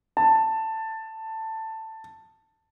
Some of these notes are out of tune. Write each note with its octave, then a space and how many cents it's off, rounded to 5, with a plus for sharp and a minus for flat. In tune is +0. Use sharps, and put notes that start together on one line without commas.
A5 +10